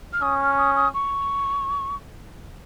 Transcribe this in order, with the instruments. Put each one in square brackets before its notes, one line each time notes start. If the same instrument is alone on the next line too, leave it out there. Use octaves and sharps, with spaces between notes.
[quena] F6
[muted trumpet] C#4 [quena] D#6
[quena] F6
D#6
D#6
C#6